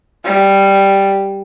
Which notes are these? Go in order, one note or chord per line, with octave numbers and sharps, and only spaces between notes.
G3